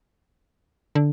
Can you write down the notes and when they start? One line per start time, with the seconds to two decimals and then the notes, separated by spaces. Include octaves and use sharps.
0.95 D3